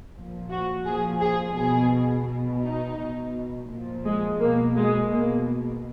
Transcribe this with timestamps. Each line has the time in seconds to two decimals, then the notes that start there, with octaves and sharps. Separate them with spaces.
0.15 A#2 F3
0.50 F#4
0.85 A#2 F3 G#4
1.21 G#4
1.57 B2 G#4
2.27 B2
2.63 D#4
2.99 B2
3.70 A#2 F3
4.06 G#3
4.41 B2 A#3
4.77 G#3
5.12 B2 A#3